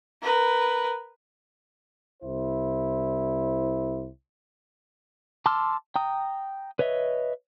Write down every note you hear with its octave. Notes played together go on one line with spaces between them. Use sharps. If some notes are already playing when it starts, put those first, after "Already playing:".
A#4 B4
C2 E4 C5
A5 C6 D6 E6 F6
G5 A#5 D#6
B4 C#5 D#5 E5